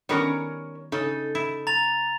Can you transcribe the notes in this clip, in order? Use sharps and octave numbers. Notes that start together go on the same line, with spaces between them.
D#3 G3 B3 C#4 A#4 C#5
C#3 D#4 A4
E4
A#5 A6 F7